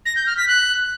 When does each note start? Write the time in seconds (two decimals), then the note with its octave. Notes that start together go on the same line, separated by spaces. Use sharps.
0.06 A#6
0.16 G6
0.27 F6
0.37 B6
0.48 F#6